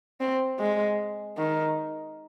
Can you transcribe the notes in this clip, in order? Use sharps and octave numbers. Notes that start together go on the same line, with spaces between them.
C4
G#3
D#3